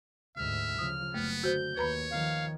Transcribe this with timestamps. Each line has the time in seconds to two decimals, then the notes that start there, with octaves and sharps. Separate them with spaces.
0.37 D2 G#2 E5 F6
0.79 C#3 F3 D#6
1.14 F#1 A3 B3
1.43 D3 F#4 C5 G6
1.77 D#2 B4 C#5 A#5 B5
2.11 D#3 F3 F5